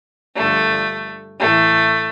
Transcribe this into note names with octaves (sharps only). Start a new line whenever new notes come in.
G2 D3 F3 A3
A2 E3 A3